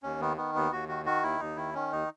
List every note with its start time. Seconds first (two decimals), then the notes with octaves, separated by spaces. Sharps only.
0.03 D#2 C#4
0.21 D#3 B3
0.37 D#3 B3
0.55 D#2 B3
0.72 D#2 F#4
0.89 D#3 F#4
1.06 D#3 F#4
1.23 D#2 E4
1.39 D#2 D#4
1.56 D#3 E4
1.74 D#3 C#4
1.92 D#2 D#4